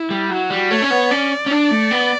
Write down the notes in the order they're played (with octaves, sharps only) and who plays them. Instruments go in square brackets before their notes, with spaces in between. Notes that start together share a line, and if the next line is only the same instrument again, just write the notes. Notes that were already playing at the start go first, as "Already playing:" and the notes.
Already playing: [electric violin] E4
[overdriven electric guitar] G3
[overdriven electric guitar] F#3 [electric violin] F#4
[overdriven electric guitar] G3
[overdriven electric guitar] A3 [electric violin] C#5
[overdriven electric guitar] C#4
B3
[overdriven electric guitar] C#4 [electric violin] D5
[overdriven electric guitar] C#4
D4
A3
B3